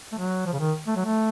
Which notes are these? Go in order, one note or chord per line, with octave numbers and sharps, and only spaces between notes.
A3
F#3
F3
C#3
D#3
A3
F#3
A3